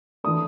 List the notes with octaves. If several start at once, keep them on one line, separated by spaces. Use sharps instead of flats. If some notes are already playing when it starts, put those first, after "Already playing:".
E3 A3 D4 D#6